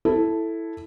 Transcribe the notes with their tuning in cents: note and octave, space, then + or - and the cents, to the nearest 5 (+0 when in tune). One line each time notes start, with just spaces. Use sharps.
E4 +0 A4 +0